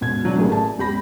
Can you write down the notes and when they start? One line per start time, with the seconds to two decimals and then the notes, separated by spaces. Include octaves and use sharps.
0.01 E1 B2 G#6
0.23 D3 F#3 D4
0.38 A1 A3 A#3 G#4
0.52 A5
0.78 E1 G4 B5 A#6